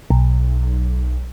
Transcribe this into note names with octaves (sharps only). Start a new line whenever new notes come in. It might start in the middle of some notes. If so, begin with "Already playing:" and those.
B1